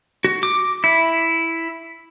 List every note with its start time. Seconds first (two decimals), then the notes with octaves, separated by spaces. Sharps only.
0.24 F#4
0.43 D6
0.84 E4